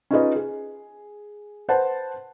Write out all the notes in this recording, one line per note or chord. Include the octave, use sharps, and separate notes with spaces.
C#4 D#4 F4 G#4 B4 D#5
G#4
B4 C5 F#5 A5